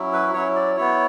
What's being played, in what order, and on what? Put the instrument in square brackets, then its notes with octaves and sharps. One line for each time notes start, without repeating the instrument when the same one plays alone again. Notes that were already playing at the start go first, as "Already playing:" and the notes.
Already playing: [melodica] F#3 C#4 E4
B4
F#3 C#4 E4 C#5
D5
B3 E4 C#5